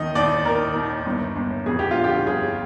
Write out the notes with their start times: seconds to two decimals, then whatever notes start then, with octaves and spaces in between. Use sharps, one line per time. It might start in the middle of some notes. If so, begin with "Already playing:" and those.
Already playing: D#2 D#3 D#5
0.15 D#2 D5
0.45 D#3 A#4
0.76 D#2
1.06 G1
1.36 G1
1.66 F2 G#4
1.79 G4
1.91 D3 F4
2.04 G4
2.26 G1 G#4